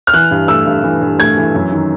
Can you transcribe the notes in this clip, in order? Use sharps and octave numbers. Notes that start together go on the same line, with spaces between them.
F6
E3 F#6
G2
A3 E6
G2
E3
G2
A3 G#6
E3
F#2
D#3